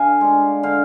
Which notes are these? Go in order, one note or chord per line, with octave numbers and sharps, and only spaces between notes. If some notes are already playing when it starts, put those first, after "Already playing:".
Already playing: D3 F5 G#5
G#3 D4
D3 F5